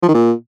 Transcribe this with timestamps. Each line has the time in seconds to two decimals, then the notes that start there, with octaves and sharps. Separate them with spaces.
0.03 F3
0.08 D#3
0.14 A#2